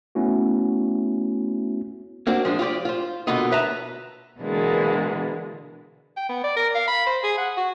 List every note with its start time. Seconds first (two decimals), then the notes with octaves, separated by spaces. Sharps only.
0.15 A3 B3 C#4 E4 F#4
2.27 A#3 C4 D4 F#4
2.45 F3 G#3 D4
2.59 F4 G4 C5 D5
2.85 F4 C5
3.27 B2 D3 A#3 B3 F4 D#5
3.52 B4 E5 A5 A#5
4.40 B2 D3 E3 G#3 A#3 B3
6.17 G5
6.29 B3
6.44 D5
6.57 A#4
6.75 F5
6.88 B5
7.06 C5
7.24 G#4
7.38 F#5
7.57 F#4